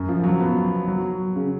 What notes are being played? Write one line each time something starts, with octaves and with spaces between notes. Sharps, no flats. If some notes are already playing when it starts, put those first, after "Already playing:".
Already playing: F#2
F3
F#3
B3
F#3
C#3